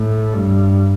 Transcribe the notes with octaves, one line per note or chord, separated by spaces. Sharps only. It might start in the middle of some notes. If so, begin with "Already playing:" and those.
Already playing: A2
G2